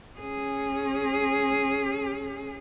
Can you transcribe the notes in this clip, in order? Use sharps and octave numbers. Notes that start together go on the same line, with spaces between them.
C#4 G#4